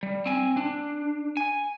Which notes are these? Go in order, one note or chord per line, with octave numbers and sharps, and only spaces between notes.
G3
C4 G#5
D4
G#5